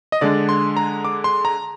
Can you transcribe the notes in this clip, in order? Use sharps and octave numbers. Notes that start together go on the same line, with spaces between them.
D#5
D3 G#3 D4 D5
C6
A#5
D6
C6
A#5